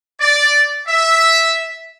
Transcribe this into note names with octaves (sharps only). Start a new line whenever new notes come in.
D5
E5